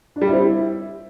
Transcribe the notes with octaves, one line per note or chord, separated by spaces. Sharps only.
D4
G3
E4
C4
E4